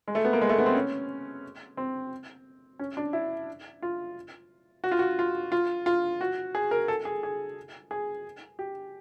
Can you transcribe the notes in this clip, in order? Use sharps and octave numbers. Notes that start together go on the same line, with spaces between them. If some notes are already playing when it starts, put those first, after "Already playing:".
G#3
A3
B3
A#3
G#3
A3
B3
C4
C#4
C4
C#4
D4
E4
F4
F#4
F4
F#4
F4
F4
F4
F#4
G#4
A#4
A4
G#4
G#4
G#4
G4